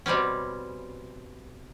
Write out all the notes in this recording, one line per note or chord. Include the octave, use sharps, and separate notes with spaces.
B2 G3 C4 C#4